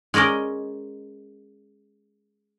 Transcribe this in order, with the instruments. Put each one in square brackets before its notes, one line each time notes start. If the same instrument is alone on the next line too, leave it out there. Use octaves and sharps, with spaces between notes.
[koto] G#3 C#4 A#4 D5 D#5